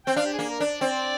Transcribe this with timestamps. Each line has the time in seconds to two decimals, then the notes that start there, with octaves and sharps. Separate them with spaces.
0.06 C4 G5
0.16 D4 F5
0.25 G4
0.33 G#4
0.39 A#3
0.50 A#4
0.60 D4 D5
0.81 C4